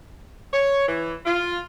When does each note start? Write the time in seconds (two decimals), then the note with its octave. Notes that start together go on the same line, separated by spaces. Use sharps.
0.54 C#5
0.88 E3
1.26 F4